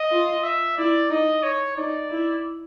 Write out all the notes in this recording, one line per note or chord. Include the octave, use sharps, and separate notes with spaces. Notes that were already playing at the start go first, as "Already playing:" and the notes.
Already playing: D#5
F4
E5
E4 D5
D#4 D#5
C#5
D#4 D5
E4